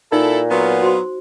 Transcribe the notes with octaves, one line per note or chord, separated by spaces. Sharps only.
A#2 D#4 E4 A4
F#3 B3 F4
F#4 C5 C6